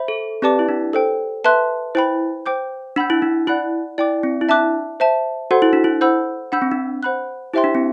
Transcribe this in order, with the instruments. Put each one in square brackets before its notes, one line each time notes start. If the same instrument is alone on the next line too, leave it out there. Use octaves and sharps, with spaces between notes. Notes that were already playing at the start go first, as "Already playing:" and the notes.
Already playing: [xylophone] C5 E5 B5
[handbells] A4
[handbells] C4 [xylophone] G4 B4 D5 A5 D6
[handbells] E4
D4
[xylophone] A4 C5 G5
B4 E5 A5 C6 F#6
[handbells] E4 [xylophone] C5 G5 B5
[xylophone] C5 G5 D6 G6
[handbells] D4 [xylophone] F#5 B5 E6 G6
[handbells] E4
D4
[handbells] E4 [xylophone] D5 F#5 B5 F#6
[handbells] E4 [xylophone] D5 G5 D6
[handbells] C4
E4
[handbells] D4 [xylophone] E5 A5 D6 F#6
[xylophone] C5 E5 A5
[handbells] F#4 [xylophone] A4 C5 F#5 C6
[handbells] E4
D4
E4
[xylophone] C5 F#5 B5 E6 G6
[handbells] D4 [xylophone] F#5 B5 E6 G6
[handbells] C4
D4
[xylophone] C5 F#5 B5 F#6
[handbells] E4 [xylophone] G4 C5 E5 G5 C6
[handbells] D4
C4